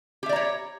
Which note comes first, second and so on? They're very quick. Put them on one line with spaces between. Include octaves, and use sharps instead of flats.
G4 E5 D5 A#5 C#5